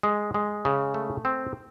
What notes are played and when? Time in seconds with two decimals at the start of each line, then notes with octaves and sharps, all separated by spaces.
0.03 G#3
0.34 G#3
0.65 C#3
0.94 A3
1.25 C4